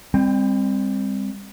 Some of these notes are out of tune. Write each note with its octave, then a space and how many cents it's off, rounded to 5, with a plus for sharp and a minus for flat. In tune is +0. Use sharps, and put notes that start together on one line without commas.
G3 +35 C4 +0